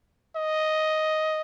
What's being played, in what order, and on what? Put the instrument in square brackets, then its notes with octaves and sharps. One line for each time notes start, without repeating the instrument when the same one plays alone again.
[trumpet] D#5